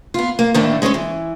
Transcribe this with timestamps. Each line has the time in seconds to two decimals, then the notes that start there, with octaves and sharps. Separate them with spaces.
0.14 B3 F4
0.39 A#3
0.54 D#2 A2 D3 E3 A3 D4
0.82 G#3 C#4 A4 C5 C#5
0.94 E3